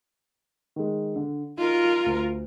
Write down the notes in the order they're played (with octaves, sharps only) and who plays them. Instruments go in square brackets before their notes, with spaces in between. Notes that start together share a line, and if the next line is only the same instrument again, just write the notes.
[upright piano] D#3 G#3
D3
[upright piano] D#4 [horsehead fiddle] F4 A#4
[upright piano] D2